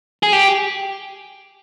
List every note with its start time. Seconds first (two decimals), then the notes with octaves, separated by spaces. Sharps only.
0.23 G#4
0.33 G4